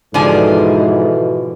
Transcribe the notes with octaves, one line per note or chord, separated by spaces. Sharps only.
G#2 B2 D3 E3 F3 A4 G#5